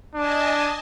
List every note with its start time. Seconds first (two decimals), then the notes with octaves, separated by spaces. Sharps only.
0.15 D4 D#5 G#5 A5